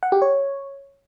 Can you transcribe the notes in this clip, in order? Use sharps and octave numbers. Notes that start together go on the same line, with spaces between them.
F#5
G4
C#5